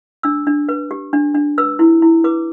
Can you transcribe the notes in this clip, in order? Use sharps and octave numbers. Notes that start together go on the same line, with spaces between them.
D4 E6
D4
B4
G4
D4
D4
B4 E6
E4
E4
B4 D6